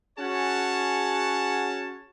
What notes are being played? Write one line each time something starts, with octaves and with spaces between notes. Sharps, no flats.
C#4 F#4 G#4 C#5 F#5 A5